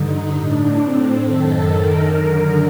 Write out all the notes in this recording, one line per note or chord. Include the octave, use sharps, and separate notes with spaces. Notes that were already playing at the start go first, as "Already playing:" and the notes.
Already playing: G2 D3 D#4
A2 D4
C4
F#2 D#3 A4
A#4
F#2 D3 A#4